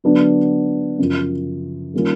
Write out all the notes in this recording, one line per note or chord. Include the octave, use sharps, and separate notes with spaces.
D3 F#3 B3 D4
F#2 C#3 F3
D#3 G3 A#3 C#4 F4